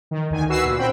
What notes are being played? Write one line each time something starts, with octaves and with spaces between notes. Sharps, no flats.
D#3
D2 D#3 G#5
F#4 B4 E6 C7
A#2
C4 G5 B5